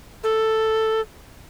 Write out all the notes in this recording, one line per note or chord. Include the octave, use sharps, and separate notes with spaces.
A4